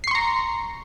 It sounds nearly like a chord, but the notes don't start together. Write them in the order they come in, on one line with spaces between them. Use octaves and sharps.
C7 C#6 C6 A#5